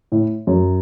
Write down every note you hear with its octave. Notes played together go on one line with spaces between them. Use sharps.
A2
F#2